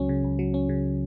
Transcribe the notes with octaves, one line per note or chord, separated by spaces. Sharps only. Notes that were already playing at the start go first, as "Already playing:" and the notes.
Already playing: C#2 F#3 C#4
C#3
C#2
F#3
C#4
C#3